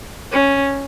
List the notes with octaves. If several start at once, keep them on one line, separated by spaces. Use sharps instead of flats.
C#4